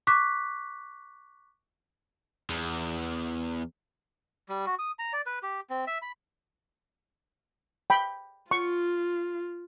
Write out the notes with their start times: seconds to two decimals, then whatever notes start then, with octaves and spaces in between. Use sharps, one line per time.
0.07 C#6 D6 F#6 B6
2.50 E2
4.49 G3
4.67 F#4
4.79 D#6
4.99 A#5
5.13 D5
5.26 B4
5.43 G4
5.70 C4
5.87 E5
6.02 B5
7.90 G5 B5
8.51 F4 C#6